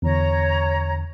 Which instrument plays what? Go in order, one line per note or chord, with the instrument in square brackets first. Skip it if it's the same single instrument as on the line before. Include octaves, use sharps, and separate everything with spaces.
[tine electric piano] E2 D3 [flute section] C#5 A#5